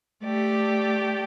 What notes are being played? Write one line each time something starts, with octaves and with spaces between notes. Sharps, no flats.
A3 G4 D5